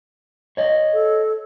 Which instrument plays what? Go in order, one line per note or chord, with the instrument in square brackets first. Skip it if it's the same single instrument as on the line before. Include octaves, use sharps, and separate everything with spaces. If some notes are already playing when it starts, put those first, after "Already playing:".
[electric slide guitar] C#5 D#5
[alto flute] A4